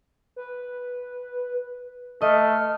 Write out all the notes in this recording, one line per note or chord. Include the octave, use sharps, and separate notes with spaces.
B4
A3 D#5 F6